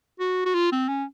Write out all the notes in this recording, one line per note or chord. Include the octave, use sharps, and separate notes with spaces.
F#4
F#4
F4
C4
C#4